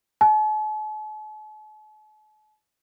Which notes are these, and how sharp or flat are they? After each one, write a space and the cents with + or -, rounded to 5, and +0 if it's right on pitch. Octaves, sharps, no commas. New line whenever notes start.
A5 -45